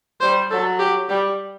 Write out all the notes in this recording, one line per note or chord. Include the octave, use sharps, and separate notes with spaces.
G3 C5
F#3 A4
G4
G3 G4